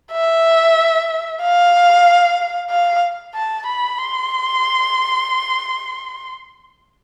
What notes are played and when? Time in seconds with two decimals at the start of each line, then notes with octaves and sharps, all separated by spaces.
0.12 E5
1.41 F5
2.71 F5
3.34 A5
3.67 B5
3.98 C6